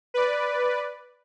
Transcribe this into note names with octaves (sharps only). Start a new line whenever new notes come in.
B4 D5